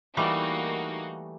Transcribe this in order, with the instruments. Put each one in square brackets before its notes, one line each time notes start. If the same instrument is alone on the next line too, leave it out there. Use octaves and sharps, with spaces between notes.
[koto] E3 G3 A3 [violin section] A#3 D#4 F#4